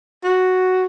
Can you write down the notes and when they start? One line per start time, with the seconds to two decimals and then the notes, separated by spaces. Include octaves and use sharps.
0.24 F#4